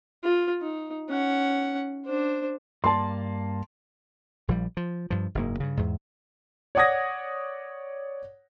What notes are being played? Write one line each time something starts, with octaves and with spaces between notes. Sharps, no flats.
F4
D#4
C#4 F#5
D4 C5
G2 A#3 D5 A5 C6
A#1 F3 G3
F3
G2 F3
F#1 G#2 A#3
G2 C#3
E2 G#2
C#5 D5 F#5 D#6 G#6 A#6